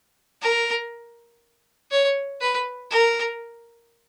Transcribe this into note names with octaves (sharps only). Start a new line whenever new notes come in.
A#4
C#5
B4
A#4